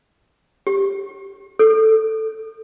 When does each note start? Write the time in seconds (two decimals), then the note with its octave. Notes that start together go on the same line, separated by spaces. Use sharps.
0.67 G4
1.59 A4